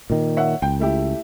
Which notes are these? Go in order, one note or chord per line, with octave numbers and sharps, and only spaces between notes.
A#2 D#3
C#5 E5 F#5
C#2 G5
A3 E4 G4